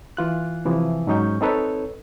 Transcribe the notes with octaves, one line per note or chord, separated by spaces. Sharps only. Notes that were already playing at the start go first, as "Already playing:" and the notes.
E3 F4 F#6
C3 E3 F3
G#2 F#3 C#4 D#4 C#6 G6
C4 D#4 A4 B4 C#5